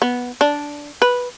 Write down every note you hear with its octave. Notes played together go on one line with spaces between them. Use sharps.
B3
D4
B4